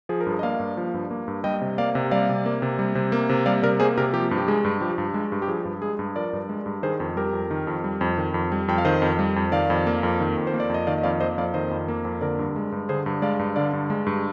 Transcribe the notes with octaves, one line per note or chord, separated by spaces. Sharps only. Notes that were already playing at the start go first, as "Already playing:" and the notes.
F3 G#4
A#4
G2 G#4
D#5
A#3 D5 F5
G2
F3
G2
A#3
G2
G3 D#5 G5
C3
A#3 D5 F5
C3
G3 D5 F5
C3
A#3
C3
G3
C3
A#3
C3
G3 D5 F5
C3 A#4 D5
A#3 G#4 C5
C3 G4 A#4
F3 G4
G2
G4
G#3 G#4
G2
F3 G4
G2
G#3
G2
G4
F3 G#4
G2
G#3 G#4
G2
F3 A#4 D5
G2
G#3
G2
D#3 G#4 C5
F2
G3 G4 A#4
F2
D#3
F2
G3
F2
D#3
F2
G3
F2 G5
F5
D#3 C5 D#5
F2
G3
F2
D#3 D5 F5
F2
A#3
F2
D#3
F2
C5
A#3
D5
F2 D#5
D#3 D5 F5
D#5
F2 D5 F5
A#3 C5 D#5
F2 D5 F5
D#3 C5 D#5
F2
A#3
F2
D3 A#4 D5
G2
G#3
G2
D3 G#4 C5
G2
G#3 D5 F5
G2
D3 D5 F5
G2
G#3
G2